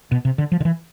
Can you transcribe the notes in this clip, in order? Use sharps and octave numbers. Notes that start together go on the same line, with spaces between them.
B2
C3
D3
F3
D3
E3